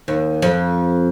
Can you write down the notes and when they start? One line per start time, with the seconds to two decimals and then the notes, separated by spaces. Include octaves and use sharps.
0.08 D#2
0.42 F2